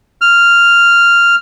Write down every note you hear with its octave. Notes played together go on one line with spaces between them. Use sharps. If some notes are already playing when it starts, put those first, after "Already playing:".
F6